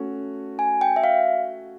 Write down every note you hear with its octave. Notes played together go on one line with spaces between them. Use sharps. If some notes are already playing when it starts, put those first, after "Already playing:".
Already playing: A3 C#4 F#4
G#5
G5
E5
F5